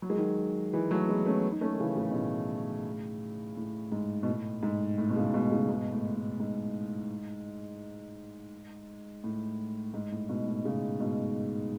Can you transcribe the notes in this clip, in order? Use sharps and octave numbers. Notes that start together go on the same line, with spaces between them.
F#3
G#3
D#3 F#3
E3 G#3
F#3 A3
G#3 B3
A3 C#4
D#4
A3 C#4
D#3
C#3 E3
A2 C#3
B2
A2 C#3
A2
G#2
B2
A2
G#2
A2
B2
A2 C#3
G#2 B2
A2 C#3
G#2 B2
A2
A2
G#2
A2
G#2
A2
G#2 B2
A2
A2 C#3
G#2 B2